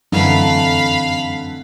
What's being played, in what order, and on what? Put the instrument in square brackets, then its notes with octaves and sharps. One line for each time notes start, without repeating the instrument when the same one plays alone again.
[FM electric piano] F#2 [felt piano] D3 E3 [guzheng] A3 C4 D#4 [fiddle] F5 B5